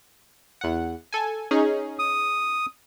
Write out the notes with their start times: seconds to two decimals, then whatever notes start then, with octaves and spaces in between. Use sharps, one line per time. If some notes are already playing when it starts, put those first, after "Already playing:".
0.61 E2 F#5
1.13 A4 G#5
1.51 C#4 D#4 G#4
1.99 D#6